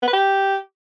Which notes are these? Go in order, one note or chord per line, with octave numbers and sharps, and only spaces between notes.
B3
B4
G4